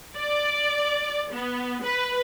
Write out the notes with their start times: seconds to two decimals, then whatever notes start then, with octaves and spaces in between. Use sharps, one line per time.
0.16 D5
1.32 B3
1.83 B4